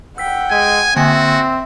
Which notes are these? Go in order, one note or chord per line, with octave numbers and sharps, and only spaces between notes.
F#5 G5 E6 B6
G#3 G#5
D3 A#3 C4 F#4 E5 G#5